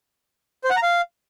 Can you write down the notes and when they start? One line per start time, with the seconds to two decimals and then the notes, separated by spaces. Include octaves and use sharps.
0.64 C5
0.70 F#5
0.76 A#5
0.83 F5